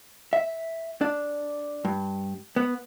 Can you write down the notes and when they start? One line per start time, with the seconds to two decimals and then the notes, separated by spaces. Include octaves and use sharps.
0.33 E5
1.01 D4
1.85 G2
2.56 B3